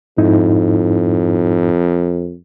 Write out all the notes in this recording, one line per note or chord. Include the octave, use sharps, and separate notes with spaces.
F2 G#2 D#4 E4